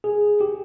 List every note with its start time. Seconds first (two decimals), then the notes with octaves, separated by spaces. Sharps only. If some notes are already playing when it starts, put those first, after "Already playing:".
0.04 G#4
0.41 G4